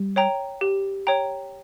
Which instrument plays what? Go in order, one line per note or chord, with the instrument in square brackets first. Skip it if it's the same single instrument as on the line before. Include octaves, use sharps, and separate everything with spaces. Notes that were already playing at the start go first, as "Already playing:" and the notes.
Already playing: [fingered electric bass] G3
[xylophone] C#5 G5 A#5
G4
C#5 G5 A#5